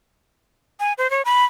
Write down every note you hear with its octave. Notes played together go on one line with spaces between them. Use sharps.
G#5
C5
C#5
B5